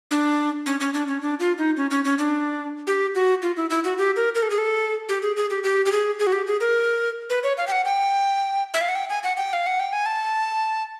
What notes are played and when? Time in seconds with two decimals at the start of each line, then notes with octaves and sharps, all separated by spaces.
0.11 D4
0.66 C#4
0.80 C#4
0.94 D4
1.08 C#4
1.22 D4
1.40 F4
1.58 D#4
1.77 C#4
1.91 C#4
2.05 C#4
2.18 D4
2.87 G4
3.15 F#4
3.42 F4
3.57 E4
3.70 E4
3.84 F#4
3.98 G4
4.16 A#4
4.35 A#4
4.43 A4
4.50 G#4
4.58 A4
5.09 G4
5.22 G#4
5.36 G#4
5.50 G4
5.64 G4
5.86 G4
5.92 G#4
6.19 G#4
6.27 F#4
6.33 G4
6.47 G#4
6.61 A#4
7.30 B4
7.43 C#5
7.57 F5
7.67 G5
7.72 F#5
7.85 G5
8.74 E5
8.81 F5
8.89 F#5
8.95 G5
9.10 G#5
9.23 F#5
9.37 G5
9.53 F5
9.66 F#5
9.80 G5
9.93 G#5
10.06 A5